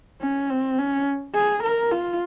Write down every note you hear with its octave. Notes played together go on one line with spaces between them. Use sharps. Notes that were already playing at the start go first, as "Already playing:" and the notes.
C#4
C4
C#4
G#4
A#4
F4